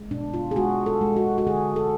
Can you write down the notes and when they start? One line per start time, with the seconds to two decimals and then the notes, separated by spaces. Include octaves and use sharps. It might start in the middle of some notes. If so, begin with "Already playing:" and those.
Already playing: G#3
0.11 B2 D4
0.34 F4
0.51 G#4
0.56 G#3 F#4
0.86 A4
1.01 G#3
1.16 F#4
1.38 F#4
1.47 D3 G#4
1.76 A4